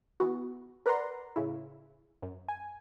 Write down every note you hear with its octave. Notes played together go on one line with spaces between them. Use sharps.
E3 B3 F#4
A#4 B4 D5 F#5 A#5 C6
A2 C#3 E4
F#2
G#5